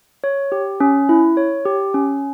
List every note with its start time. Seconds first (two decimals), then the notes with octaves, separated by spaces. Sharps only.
0.24 C#5
0.52 G4
0.80 C#4
1.09 E4
1.37 C#5
1.65 G4
1.94 C#4